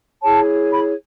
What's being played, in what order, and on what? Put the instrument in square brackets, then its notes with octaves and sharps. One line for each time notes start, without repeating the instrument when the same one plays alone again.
[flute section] E4 G#4 C#5 A5
B5